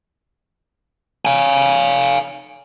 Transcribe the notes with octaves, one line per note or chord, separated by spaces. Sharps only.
F5 G#5